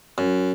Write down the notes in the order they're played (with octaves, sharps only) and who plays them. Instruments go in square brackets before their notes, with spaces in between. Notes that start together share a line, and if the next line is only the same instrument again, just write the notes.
[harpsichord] F#2